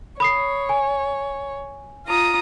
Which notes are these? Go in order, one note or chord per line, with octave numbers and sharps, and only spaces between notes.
C#5 B5 D#6 C7
G#5
F4 A#5 D#6